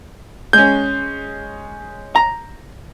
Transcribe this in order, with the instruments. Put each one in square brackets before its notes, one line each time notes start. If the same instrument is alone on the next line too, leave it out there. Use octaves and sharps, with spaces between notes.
[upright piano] G#3 C#4 [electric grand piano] G6
[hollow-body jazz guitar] A#5